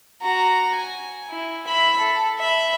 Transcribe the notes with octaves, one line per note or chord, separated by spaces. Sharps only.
F#4 A#5
G#5
E4
E5 B5
A4
E5 B5